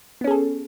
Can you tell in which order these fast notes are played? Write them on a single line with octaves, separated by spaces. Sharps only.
B3 C#4 G#4 A4